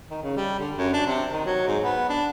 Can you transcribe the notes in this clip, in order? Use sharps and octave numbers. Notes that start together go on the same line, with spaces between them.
D#3
C#3
G3
D3
F#2
D4
C3
D#3
F#3
G#2
B3
D4